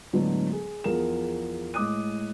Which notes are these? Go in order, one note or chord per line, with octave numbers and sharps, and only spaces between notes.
A2 D3 F#3 G#3 B3
G#4
E2 F3 G#4 A#4 E7
A2 G#3 D6 D#6 F#6 D#7